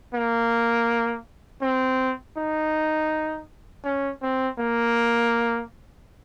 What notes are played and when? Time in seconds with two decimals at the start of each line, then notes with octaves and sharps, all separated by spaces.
0.14 A#3
1.62 C4
2.37 D#4
3.85 C#4
4.22 C4
4.59 A#3